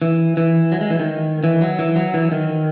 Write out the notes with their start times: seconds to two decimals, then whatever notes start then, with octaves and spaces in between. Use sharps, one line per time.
0.02 E3
0.37 E3
0.72 F#3
0.81 G#3
0.90 E3
1.00 D#3
1.44 E3
1.61 F#3
1.79 E3
1.96 F#3
2.14 E3
2.32 D#3